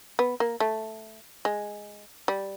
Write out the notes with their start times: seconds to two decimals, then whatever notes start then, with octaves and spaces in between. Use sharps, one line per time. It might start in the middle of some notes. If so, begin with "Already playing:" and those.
0.19 B3
0.40 A#3
0.60 A3
1.45 G#3
2.28 G3